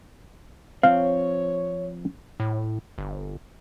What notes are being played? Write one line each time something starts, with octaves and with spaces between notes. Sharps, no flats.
F3 C4 C#5 F5
A2
G1